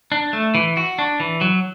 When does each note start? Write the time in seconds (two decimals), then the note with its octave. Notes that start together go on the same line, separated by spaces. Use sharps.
0.12 D4
0.33 A3
0.55 E3
0.77 F#4
0.99 D4
1.20 E3
1.41 F#3